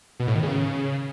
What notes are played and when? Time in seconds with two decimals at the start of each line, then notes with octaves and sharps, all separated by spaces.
0.20 B2
0.27 A2
0.35 D#3
0.43 C#3